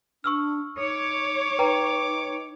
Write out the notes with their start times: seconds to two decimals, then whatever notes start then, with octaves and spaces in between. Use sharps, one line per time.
0.24 D4 C#6 E6 F6
0.78 D#4 C#5 D6
1.59 D#4 B4 G5 A#5